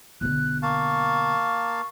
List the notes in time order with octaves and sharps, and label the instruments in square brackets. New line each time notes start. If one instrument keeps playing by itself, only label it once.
[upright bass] B1 D3 [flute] F#6
[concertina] A#3 F5 A5 [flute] C#6